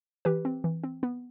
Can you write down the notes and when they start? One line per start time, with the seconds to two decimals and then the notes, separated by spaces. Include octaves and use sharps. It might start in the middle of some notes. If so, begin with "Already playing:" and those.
0.25 E3 G4 B4
0.45 C4
0.64 E3
0.84 C4
1.03 B3